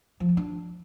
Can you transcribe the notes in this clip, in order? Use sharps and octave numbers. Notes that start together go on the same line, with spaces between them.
F3
C4
D4